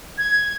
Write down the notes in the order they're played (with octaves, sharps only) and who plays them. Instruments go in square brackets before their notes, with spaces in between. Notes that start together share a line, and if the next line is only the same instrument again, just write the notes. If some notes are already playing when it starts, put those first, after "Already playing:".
[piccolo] G#6